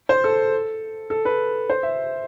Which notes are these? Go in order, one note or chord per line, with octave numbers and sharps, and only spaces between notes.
C5
A4
A4
B4
C5
E5